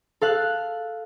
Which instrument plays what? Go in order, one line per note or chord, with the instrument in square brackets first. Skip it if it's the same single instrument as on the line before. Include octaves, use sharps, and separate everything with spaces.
[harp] A4 F5 F#6